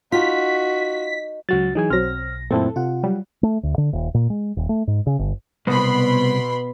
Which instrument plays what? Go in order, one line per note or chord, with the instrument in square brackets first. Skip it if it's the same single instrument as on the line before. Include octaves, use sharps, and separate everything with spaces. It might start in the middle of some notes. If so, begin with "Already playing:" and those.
[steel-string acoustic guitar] D#4 [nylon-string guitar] F4 [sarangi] F#4 [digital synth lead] B6
[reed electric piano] C#2 F#4 A6 [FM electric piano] F#3
[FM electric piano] E3 F#3 [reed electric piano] D#4 G#4 G#5
[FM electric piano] B1 A#6 [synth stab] F#3 C4 [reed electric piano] F6
[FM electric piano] F#2 A3 [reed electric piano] A#2 C4 E4 [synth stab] A4
[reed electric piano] C3 [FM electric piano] F4 F#5
[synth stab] F#3 G3
[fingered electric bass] A3
D2
D3
D#1
A#2
G#3
D#1
A3
G#2
C#3
G1
[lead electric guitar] C2 [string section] B2 B5 C6 [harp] B3